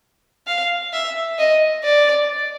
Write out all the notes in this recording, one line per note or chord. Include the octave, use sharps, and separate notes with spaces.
F5
E5
D#5
D5